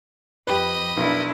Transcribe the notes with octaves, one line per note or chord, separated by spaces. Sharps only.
F2 G4 B4 D#5 B5
B1 D4 E4 A#4